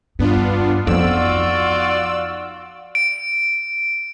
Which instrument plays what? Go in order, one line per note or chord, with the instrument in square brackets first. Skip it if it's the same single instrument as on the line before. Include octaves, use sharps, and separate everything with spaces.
[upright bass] G2 [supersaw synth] B3 D4 F4
[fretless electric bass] F2 [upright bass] B3 D#4 [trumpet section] F4 F#4 D5 [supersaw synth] E6
[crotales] D7